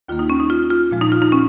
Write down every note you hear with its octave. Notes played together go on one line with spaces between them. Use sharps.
D#2 D#3 A#3 F4
D#4
C#4
D#4
F4
F4
A#2 F3 G#3
D#4
F4
D#4
C#4